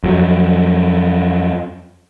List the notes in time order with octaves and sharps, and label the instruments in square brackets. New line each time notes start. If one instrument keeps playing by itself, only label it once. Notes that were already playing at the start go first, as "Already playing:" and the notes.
[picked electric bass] F2 F#3